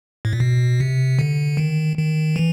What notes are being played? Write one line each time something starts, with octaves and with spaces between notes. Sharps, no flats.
A2
A#2
B2
C3
D3
D#3
D#3
E3